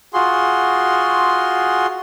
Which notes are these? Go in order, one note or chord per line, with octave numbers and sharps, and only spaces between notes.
F4 F#4 G#4 C6